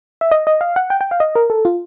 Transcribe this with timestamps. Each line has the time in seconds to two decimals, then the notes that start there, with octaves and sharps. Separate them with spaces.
0.21 E5
0.32 D#5
0.47 D#5
0.61 F5
0.76 F#5
0.90 G5
1.01 G5
1.11 F5
1.20 D#5
1.35 A#4
1.50 A4
1.65 F4